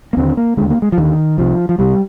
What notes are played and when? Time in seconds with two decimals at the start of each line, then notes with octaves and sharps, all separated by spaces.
0.13 A#3
0.17 D#2 D3 C4
0.37 A#3
0.57 D#2 D3 G#3
0.70 A#3
0.82 G#3
0.92 F3
0.97 D#2 D3 D#3
1.38 C2 C3 F3
1.69 F3
1.78 C2 C3 G3